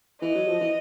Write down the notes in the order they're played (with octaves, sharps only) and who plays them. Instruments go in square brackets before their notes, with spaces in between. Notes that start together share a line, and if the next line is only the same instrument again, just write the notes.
[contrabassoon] E3 [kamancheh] D#5
[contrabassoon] F#3
F3
E3